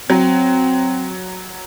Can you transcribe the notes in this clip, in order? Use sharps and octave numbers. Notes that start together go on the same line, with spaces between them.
F#3 C4